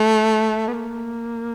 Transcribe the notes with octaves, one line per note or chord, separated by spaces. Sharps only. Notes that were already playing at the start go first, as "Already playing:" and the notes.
Already playing: A3
B3
A#3